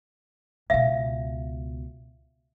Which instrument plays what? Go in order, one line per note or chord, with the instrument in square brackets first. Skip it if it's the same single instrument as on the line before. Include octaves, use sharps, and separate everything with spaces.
[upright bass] C#2 B2 [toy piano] E5 F5